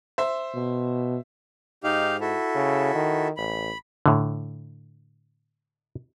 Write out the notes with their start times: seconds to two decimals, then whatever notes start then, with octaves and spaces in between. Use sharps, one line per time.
0.18 C5 E5
0.54 B2
1.84 G#2 D#4 G4 F5
2.20 E4 F#4 A4
2.55 C#3
2.95 D#3
3.37 A1 B5
4.06 A2 D3